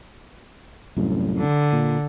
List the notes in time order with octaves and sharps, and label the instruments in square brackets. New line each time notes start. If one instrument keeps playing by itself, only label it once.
[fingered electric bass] C2 F#2 A2
[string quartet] D3
[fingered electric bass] A#2